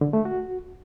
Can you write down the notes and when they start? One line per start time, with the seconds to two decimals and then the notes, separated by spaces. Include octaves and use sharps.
0.01 D3
0.13 A3
0.25 F#4